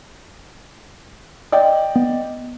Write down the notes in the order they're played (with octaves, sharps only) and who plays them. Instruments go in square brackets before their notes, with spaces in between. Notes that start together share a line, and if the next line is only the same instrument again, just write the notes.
[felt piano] D5 D#5 G5
[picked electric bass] B3